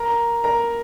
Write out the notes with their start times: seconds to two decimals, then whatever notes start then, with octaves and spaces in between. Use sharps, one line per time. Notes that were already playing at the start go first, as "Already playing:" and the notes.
Already playing: A#4 A#5
0.44 A#4 A#5